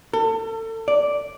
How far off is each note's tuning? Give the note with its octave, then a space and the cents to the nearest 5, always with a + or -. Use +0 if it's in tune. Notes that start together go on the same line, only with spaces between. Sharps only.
A4 +35
D5 -5